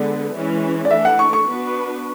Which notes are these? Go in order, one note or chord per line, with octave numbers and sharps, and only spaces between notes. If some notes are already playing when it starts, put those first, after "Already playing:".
Already playing: D3 G#3 B3 D5
E3 G#3 C#4
D5
E3 A3 D4 A4 E5
F#5
C#6
C#6
B3 D4 F#4 B4